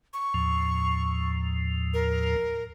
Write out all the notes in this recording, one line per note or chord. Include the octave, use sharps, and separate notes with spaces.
C#6
D#2 A2 F3
A#4